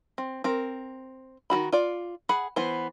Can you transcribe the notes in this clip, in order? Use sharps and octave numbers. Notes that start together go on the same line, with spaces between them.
C4
C4 A#4
D#3 F3 F#4 B5
F4 D5
G#4 F#5 B5
E3 B3 C5